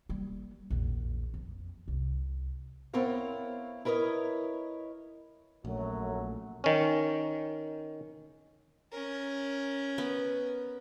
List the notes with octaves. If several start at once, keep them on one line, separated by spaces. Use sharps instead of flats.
G3 A#3
A#1 E2
F2
C2
B3 C4 E4 A#4 C#5 F5
E4 A#4 B4 C#5 D#5
A#1 F#2 F#3 A3
D#3 C#4
C#4 A#4
B3